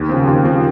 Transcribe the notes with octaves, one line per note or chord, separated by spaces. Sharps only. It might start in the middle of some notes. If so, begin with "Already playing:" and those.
Already playing: D#2
C#3 F3 C4
D#2
C#3 F3 C4